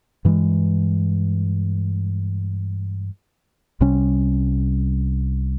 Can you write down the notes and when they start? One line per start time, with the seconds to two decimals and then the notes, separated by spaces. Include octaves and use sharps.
0.25 G2 E3 G#3
3.80 C2 C3 G3 C#4